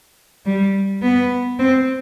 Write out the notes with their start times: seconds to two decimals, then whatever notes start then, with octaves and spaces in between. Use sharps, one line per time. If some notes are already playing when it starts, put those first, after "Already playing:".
0.46 G3
1.02 B3
1.59 C4